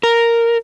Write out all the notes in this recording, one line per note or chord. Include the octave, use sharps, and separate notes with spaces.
A#4